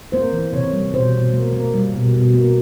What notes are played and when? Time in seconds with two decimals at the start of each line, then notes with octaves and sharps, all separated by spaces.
0.12 A#3 C5
0.33 E3
0.53 C3 C#5
0.72 G3
0.93 B2 C5
1.14 B2
1.33 A#3
1.53 A#3
1.74 G3
1.94 B2
2.14 B2
2.34 A#3